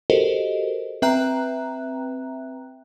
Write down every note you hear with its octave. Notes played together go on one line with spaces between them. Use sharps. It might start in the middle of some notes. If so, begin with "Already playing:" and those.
F#4 G4 A4 A#4 C5 D#5
C4 B4 E5 G5 A#5 F#6